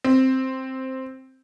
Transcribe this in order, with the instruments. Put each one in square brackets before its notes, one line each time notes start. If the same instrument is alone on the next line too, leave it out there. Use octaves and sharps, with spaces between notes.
[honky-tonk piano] C4